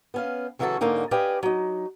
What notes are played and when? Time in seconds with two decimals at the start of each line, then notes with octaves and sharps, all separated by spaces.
0.14 B3 C#4 F5
0.59 C#3 E3 F#3 C#4 F#4 A4
0.81 G#2 D3 A#3 C#4 D#4
1.11 G4 B4 D5 D#5 F5 G#5
1.43 F#3 D#4